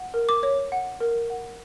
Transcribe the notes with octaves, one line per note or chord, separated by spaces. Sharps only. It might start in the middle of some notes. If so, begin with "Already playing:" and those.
Already playing: F#5
A#4
D6
C#5
F#5
A#4
F#5